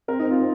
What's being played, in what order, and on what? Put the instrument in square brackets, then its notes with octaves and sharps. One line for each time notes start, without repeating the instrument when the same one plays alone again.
[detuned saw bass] C4 [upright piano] A#4
[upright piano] D#4
F4